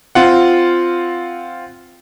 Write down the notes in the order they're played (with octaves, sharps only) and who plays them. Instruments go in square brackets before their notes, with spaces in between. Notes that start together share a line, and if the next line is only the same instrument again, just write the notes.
[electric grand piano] C4 F4 F#5